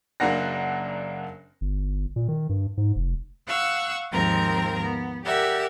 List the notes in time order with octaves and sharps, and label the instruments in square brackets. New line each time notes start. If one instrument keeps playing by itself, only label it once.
[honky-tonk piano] F#1 F#3 A#3 D4 F#5 A#6
[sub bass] G1
A#2
D#3
G2
G#2
F1
[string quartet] F5 F#5 C#6 E6
D#2 G#2 F3 C4 A#4 A#5
B3
G4 A#4 D5 E5 F#5